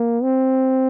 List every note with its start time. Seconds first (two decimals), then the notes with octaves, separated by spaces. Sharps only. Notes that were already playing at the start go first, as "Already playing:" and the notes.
Already playing: A#3
0.23 C4